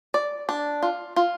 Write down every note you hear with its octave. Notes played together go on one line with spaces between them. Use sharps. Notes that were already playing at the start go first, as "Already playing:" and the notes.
D5
D4
F4
F4